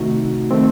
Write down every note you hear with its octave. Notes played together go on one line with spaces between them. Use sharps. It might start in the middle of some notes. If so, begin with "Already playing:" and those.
Already playing: C3 D#3 A3 D#4 F#4
D#3 A3 C4